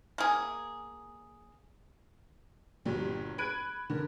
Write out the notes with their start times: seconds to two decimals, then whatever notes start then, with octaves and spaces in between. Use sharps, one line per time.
0.18 A#3 G#4
2.85 G1 A#2 F#3 G3
3.38 B5 F#6 G#6 D7 D#7
3.90 D3 A#4